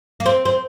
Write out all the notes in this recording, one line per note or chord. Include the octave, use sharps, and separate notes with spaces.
A#3
C4
C4